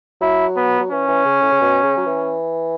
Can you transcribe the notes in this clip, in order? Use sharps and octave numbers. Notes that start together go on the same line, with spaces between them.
F#3 E4
B3
F#3
E3 C#4
E3
C#3
A2
C#3
B2
C#3
F#3
E3